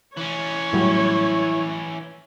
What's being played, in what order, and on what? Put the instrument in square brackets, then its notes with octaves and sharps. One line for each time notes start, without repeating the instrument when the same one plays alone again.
[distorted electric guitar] E3 C#4 [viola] C#5
[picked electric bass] A2 F#3 G3 [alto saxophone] E4